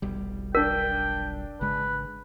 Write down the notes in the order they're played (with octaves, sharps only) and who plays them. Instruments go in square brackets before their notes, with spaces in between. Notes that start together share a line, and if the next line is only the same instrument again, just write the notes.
[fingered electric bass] F1 B1 G3
[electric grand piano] D4 B6 [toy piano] A#4 [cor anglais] G5
[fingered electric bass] G#1 C#3 G#3 [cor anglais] B4